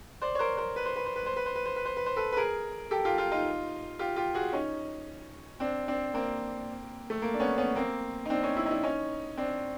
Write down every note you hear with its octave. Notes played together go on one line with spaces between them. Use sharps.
C5 D5
C#5
A#4 C5
A#4 C5
B4
C5
B4
C5
B4
C5
B4
C5
B4
C5
B4
C5
B4
C5
A4 B4
B4
G#4 A#4
G4 A4
F4 G4
F4 G4
D#4 F4
F4 G4
F4 G4
F#4 G#4
C#4 D#4
C4 D4
C4 D4
A#3 C4
A3
A#3
D4
B3 C#4
B3 C#4
A#3 C4
D#4
C4 D4
C#4 D#4
D4 E4
D#4
D4 E4
C#4 D#4
C4 D4